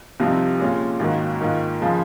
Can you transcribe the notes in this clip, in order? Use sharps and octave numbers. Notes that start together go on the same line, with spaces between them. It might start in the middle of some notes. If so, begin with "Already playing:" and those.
C2 C3 F3 C4 D#4
A#2 G#3 C#4 F4
G#1 G#2 D#3 F#3 A#3
G#2 D#3 A#3 F4
C#3 F3 G#3